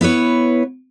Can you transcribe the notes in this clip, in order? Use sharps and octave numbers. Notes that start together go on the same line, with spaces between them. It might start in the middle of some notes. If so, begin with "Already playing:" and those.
B3 E4 B4 C#5